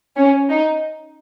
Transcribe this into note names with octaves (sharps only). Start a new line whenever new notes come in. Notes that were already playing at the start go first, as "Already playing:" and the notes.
C#4
D#4